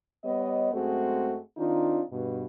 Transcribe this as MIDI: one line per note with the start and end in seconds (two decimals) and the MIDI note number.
0.24 0.70 55
0.24 0.70 59
0.24 0.70 73
0.24 0.70 75
0.72 1.38 42
0.72 1.38 56
0.72 1.38 57
0.72 1.38 60
0.72 1.38 66
0.72 1.38 68
1.57 2.02 51
1.57 2.02 60
1.57 2.02 62
1.57 2.02 63
1.57 2.02 65
2.11 2.44 43
2.11 2.44 47